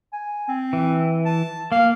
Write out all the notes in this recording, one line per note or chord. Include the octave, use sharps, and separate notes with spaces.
G#5
C4
E3
A5
A#3 F5